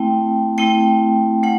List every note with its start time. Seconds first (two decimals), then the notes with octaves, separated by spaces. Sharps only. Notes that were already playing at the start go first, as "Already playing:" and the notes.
Already playing: A3 C4 E4 G5
0.58 A3 C4 E4 G5
1.43 A3 F#5